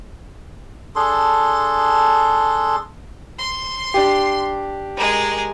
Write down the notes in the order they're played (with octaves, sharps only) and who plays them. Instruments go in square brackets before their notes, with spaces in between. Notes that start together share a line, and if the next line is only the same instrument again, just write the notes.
[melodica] D4 G#4 A4 C6
[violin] C6
[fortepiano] D4 G4
[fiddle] G#3 G#4 [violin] A#4